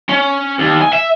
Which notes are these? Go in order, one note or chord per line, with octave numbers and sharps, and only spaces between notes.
C#4
D#2
G#5
E5